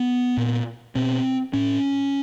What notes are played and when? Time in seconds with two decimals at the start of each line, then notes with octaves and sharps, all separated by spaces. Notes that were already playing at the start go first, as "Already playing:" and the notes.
Already playing: B3
0.37 A#2
0.95 B2 C4
1.53 A2 C#4